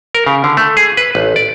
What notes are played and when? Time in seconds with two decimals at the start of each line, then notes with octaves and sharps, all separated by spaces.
0.15 A#4
0.26 C#3
0.44 D3
0.57 A3
0.77 G#4
0.97 B4
1.15 A1
1.36 D5